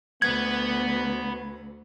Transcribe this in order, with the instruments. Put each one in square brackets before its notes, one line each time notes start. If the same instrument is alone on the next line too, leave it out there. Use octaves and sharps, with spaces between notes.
[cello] D2 [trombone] B3 [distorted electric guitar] B4 F#5 [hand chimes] G#6